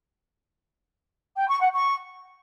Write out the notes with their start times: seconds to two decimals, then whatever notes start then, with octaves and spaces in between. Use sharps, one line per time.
1.36 G5
1.48 C#6
1.60 F#5
1.72 C#6